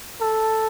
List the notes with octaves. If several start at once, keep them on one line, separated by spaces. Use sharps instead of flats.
A4